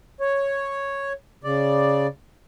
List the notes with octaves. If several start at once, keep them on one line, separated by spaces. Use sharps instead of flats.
C#5
C#3 D5